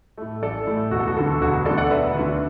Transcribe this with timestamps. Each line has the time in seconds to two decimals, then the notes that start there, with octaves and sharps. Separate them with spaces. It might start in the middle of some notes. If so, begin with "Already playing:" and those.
0.17 A2 A3
0.42 A1 A4 D5
0.67 A2 A3
0.91 E1 F#4
0.99 A4
1.07 F#4
1.17 D2 D3 A4
1.41 E1 F#4
1.66 D2 D3 A4 D5
1.78 D5 F#5
1.91 E1 B4 E5
2.15 D2 D3